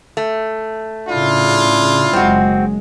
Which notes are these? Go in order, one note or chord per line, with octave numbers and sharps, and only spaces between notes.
A3
A2 C#3 D4 E4 F4
F#1 F#3 G#3 C4 F#4